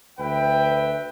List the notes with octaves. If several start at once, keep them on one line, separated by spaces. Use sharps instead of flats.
D2 B4 E5 G5